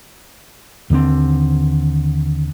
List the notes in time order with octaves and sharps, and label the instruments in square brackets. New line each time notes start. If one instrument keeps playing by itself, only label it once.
[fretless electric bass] D#2 D3 A3 C4